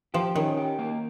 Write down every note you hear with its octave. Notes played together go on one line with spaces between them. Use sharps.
F3 G4
D#3 C#4
G4
A#3